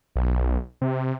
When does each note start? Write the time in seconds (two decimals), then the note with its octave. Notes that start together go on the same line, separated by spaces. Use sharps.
0.16 B1
0.81 C3